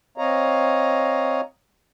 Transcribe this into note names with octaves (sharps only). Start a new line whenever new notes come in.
C4 C#5 D#5 F5 A#5